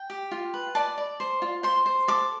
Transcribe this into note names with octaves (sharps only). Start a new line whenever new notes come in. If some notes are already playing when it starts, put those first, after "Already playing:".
Already playing: G5
G4
F4
B4
D5 A5
D5
C5
F4
C5 C6
C5
A4 D6